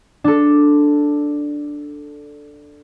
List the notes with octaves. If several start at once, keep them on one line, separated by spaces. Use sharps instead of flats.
D4 A4